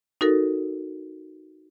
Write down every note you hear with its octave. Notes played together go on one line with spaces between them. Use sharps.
D#4 F#4 A4 A#4